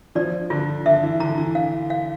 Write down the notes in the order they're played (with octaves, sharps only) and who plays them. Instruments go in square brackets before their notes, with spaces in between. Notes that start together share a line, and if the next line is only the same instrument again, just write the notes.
[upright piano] F3 [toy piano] D5
[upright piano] D3 [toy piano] F4
[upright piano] D3 [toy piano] E5
[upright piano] E3
[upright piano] D3 [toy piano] A#5
[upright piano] E3
[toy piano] F5
F5